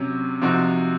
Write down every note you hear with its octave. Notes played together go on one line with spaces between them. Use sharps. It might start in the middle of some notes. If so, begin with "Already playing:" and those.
Already playing: C3 F#3 C#4
C3 F3 C4 D#4 F#4